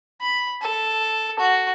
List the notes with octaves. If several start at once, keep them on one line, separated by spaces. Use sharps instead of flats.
B5
A4
F#4